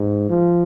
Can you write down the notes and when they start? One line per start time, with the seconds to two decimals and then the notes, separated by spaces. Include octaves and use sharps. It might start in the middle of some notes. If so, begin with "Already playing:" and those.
Already playing: G#2
0.30 F3